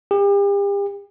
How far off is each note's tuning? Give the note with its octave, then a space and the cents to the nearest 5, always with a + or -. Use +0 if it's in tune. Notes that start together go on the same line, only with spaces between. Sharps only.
G4 +40